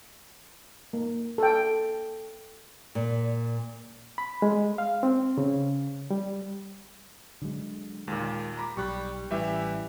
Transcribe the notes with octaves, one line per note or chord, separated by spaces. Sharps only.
A#3
A4 G5
A#2
B5
G#3
F5
C4
C#3
G3
D3 F#3 G#3
D#2 A#2 G#3
A#5 B5 D6
B1 G3 C#6 F#6
A1 E3 G3 G4 E5